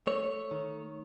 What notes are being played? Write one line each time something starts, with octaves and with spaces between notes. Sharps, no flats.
A3 C#5
D#3